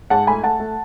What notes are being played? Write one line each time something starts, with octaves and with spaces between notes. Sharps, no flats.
G#2 F#5 A5
A3 G#5 B5
A3 F#5 A5
A3